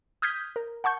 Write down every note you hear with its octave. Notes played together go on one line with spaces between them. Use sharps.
D#6 F6 G6 G#6 B6
A#4
F#5 A5 C#6 G6